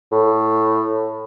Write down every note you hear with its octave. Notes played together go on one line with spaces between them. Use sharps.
A2